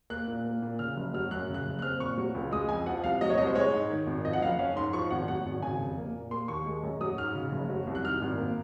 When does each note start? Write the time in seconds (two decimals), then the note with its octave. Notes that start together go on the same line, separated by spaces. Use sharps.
0.10 A#3 F#6
0.28 A#2
0.45 A#3
0.62 A#2
0.79 C#3 F6
0.97 F#1
1.14 F#3 F6
1.31 F#2 F#6
1.49 C#3
1.54 F#6
1.66 F#1
1.79 F#6
1.82 C4 F6
2.00 A#2 C#6
2.17 F#3
2.35 C#2
2.51 G#3 D#6
2.69 F2 G#5
2.86 F3 F#5
3.04 C2 F5
3.21 F#3 D#5
3.30 C#5
3.38 C2 D#5
3.47 C5
3.55 G#3 C#5
3.73 G#2
3.90 D#3
4.07 G#1
4.25 F3 D#5
4.33 F#5
4.42 F#1 F5
4.59 C#4 F5
4.76 G#2 C6
4.93 F3 C#6
5.10 G#1 F#5
5.28 F#3 F#5
5.46 G#1
5.62 C#3 G#5
5.80 F1
5.98 A#3
6.15 A#2
6.31 A#3 C6
6.48 D#2 C#6
6.66 G#3
6.83 F#2
7.01 F#3 D#6
7.18 G#2 F6
7.35 C#3
7.52 F#1
7.69 F#3
7.87 C2
7.95 F#6
8.04 D#3 F6
8.22 G#1
8.38 A#3